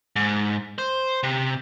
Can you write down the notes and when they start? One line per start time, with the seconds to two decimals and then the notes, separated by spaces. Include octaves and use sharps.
0.16 G#2
0.78 C5
1.23 C3